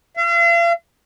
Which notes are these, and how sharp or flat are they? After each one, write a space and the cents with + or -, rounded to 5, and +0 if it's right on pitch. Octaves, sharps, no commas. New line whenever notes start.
F5 -40